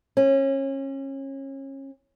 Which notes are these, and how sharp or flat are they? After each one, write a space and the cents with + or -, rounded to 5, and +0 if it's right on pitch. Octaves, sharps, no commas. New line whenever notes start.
C#4 -30